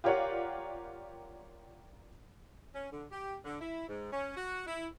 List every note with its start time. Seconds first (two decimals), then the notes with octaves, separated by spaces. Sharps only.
0.04 F4 G4 A#4 C#5 D5 F#5
2.74 C#4
2.91 D3
3.11 G4
3.45 D3
3.61 E4
3.88 G#2
4.12 C#4
4.37 F#4
4.67 E4